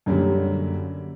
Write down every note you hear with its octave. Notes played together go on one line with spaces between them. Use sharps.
F#2 D3 F#3 G3 A#3